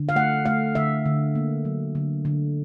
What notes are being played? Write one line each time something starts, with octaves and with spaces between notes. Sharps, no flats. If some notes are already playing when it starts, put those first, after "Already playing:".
Already playing: D3
F5
A3 F#5
A3 F5
D3 E5
D3
A#3
F#3
D3
D3